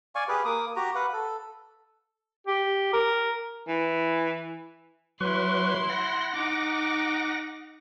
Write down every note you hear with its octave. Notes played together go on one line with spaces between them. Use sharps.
D5 F5 G#5 C#6
G4 G#4 B4 F5
A#3 D6 D#6
F#4 G4 A#5
B4 F5 F#5
A4
G4
A#4
E3
F#3 E4 B4 C6 C#6
F#5 A#6
D#4 D6